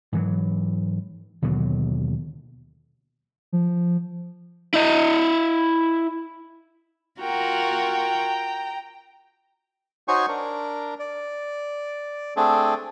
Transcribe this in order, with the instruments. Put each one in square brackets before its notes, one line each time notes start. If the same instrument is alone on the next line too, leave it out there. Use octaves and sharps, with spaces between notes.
[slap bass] G#2 E3 F#3
D#2 B2 D3 F#3
[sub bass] F3
[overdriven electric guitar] E4 D#5
[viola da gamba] F4 F#4 A#4 [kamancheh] G5 A#5
[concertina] D#4 F#4 C5 C#5 G#5 C#6
D4 A#4
D5
A3 C4 D4 G#4 A4